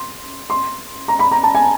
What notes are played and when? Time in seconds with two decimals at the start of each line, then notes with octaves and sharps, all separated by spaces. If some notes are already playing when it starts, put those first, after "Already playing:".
Already playing: C6
0.50 C6
1.08 A#5
1.19 B5
1.31 A#5
1.43 A5
1.55 G#5